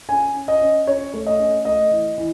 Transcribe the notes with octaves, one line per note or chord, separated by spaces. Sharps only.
C#4 G#5
C#4
D#5
C#4
C#4 C#5
A3
D#5
C#4
A3 D#5
E3
E3